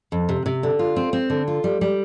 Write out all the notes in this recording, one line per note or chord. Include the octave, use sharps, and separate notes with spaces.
F2
C3
C3
D3
F4
C4
C4
D3
F4
G3
G3